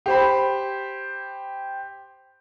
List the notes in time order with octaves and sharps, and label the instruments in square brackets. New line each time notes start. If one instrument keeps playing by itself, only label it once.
[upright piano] G4 C5 B5